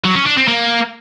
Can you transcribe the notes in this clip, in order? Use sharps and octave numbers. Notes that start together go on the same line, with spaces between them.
F#3
C#4
D4
C4
A#3